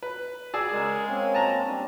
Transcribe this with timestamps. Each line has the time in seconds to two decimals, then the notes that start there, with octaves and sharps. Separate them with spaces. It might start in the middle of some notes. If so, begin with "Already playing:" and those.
0.03 B4
0.54 G#4 D5 E6
0.73 C#3 G#3 A#4 G#5
1.08 A#3 C4 C#4
1.35 A5 A#5
1.66 G3 C4 D4